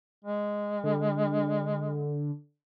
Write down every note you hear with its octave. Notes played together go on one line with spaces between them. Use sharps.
G#3
D3